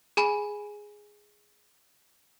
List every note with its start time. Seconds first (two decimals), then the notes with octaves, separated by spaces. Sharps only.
0.17 G#4 G#5 B5